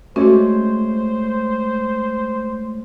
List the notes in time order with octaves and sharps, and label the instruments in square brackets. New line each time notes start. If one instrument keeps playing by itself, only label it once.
[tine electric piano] G#3 A3 C#5 [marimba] C#4 [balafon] F#4 [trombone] C5